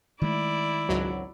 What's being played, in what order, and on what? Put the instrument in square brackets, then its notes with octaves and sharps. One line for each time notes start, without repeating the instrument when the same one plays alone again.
[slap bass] D#3 G#3 A3 [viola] E4 D5
[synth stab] G#1 C#2 F#3